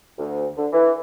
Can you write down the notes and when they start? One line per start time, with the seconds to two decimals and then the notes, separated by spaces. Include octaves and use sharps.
0.19 D2
0.58 D3
0.73 E3